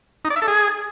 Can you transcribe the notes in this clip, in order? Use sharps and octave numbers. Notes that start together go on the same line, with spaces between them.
D#4
D5
E5
A4
G#4